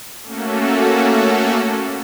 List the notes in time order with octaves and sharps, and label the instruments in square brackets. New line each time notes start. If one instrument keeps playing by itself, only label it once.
[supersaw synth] A3 A#3 C#4 F#4 A4